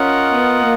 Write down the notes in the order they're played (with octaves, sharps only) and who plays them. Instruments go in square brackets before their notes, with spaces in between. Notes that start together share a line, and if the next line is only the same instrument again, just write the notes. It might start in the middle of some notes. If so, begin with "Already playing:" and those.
Already playing: [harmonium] C#4 [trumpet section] F4 A#4 D#5 F#5
[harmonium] B3
A#3